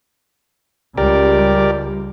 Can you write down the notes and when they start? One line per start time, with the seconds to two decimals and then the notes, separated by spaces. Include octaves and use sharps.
0.98 C#2 G3 G4 A#4 D5